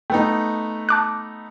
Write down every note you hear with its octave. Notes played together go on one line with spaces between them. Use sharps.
A3 B3 D#4 G5
A5 D6 F#6